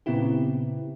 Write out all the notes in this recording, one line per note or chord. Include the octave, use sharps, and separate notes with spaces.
A#2 C#3 B3 C4 E4 G4